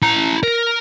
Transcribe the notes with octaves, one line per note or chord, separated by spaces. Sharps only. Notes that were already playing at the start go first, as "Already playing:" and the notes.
E4 A#5
A#4